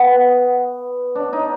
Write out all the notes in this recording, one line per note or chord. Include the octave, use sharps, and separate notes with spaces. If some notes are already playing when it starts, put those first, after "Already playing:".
Already playing: B3
D4
D#4